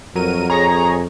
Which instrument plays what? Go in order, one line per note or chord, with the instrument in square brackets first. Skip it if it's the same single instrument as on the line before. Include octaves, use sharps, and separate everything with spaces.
[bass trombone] F2 [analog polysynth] F#3 A#4 D#7
[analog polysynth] G#4 C#5 [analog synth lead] A#5